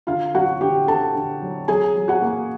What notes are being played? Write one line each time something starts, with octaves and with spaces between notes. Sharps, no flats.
D3 F4 F5
F#3 F#4 F#5
D3 G4 G5
D3 A4 A5
D3
F#3
F#3 G#4 G#5
F#3
F#4 F#5
A#3